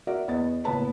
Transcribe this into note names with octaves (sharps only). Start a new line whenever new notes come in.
F#4 A#4 D5 E5 F#5
E2 B3 D#5 A6
F#1 A2 B3 B4 A5 B5